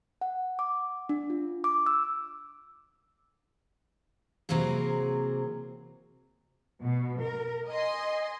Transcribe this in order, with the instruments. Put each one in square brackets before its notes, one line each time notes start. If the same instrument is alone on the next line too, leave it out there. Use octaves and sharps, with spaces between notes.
[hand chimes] F#5
D6
D4
F4
D6
E6
[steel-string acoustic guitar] C3 E3 F#3 A#3 C4 G#4
[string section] B2
A#4
D#5 G#5 C6